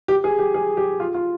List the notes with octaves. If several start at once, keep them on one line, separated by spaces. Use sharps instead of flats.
G4
G#4
G4
G#4
G4
F4
F4